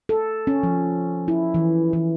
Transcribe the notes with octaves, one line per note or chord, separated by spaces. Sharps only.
A4
C#4
F3
E4
E3
E3